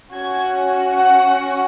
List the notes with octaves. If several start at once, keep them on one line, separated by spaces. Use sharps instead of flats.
C#4 F#4 G#6
F#5